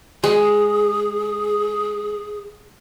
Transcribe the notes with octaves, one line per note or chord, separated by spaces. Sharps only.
G#3 G#4